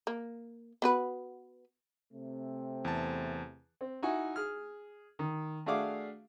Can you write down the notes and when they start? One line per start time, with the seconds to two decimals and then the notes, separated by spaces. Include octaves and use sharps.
0.07 A#3
0.82 B3 F#4 B4
2.13 C3 A3 C4
2.85 E2 A5
3.81 C4
4.03 D#4 E4 F#4 G#5
4.36 G#4 F6
5.19 D#3
5.66 A3 D4 F#4 G#4 F5 D6